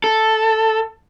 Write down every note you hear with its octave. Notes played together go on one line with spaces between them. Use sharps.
A4